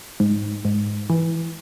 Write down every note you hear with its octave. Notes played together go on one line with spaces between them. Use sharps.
G#2
G#2
E3